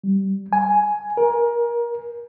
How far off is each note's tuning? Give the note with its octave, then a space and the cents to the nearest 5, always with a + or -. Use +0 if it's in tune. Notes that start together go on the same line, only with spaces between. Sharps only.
G3 -15
G#5 +10
A#4 +25